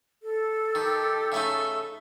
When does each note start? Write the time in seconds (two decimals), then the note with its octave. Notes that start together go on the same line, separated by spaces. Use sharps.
0.23 A4
0.75 D#3 G4
1.32 C#3 A3 D#4 E5